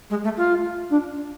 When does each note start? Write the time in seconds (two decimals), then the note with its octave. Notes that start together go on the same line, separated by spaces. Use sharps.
0.10 G#3
0.23 A3
0.37 F4
0.90 D4